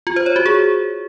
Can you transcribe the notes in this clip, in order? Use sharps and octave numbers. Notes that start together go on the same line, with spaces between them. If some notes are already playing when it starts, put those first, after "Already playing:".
F4
C5
C#5
F#4
G#4